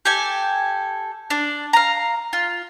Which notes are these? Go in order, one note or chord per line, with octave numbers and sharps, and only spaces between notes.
G4 A4 G#5
D4
F5 A#5
F4